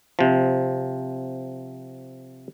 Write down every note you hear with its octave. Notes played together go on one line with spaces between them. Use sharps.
C3 F3